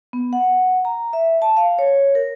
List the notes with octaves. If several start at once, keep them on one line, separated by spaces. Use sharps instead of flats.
B3
F#5
A#5
E5
A5
F5
C#5
A#4